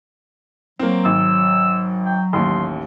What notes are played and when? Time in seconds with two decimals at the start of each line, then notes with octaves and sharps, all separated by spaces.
0.79 F#3 A#3 C4
1.05 G#1 E6
2.06 G5
2.33 A1 D#2 C6